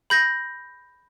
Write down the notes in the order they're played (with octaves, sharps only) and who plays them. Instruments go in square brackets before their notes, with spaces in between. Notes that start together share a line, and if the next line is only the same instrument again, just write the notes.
[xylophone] B5 G6 A#6